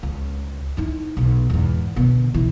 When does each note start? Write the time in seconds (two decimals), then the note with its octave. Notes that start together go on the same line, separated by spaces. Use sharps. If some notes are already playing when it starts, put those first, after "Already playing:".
0.03 C#2
0.77 D#4 E4
1.17 B1 B2
1.50 E2 G#2
1.96 B2 D3
2.34 C#3 E3